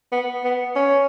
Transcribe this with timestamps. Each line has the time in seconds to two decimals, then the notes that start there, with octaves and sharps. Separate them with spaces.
0.12 B3
0.44 B3
0.76 C#4